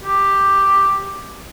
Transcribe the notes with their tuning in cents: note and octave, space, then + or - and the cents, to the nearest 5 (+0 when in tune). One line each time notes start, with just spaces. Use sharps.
G4 +5